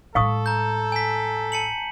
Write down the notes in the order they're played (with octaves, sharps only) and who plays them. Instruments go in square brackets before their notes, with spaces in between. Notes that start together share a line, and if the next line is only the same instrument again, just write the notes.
[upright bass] A2 G#3 [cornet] A4 [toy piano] F5 C#6 D#6
[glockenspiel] A#5 G6
G#5 B6
A5 C#7 F#7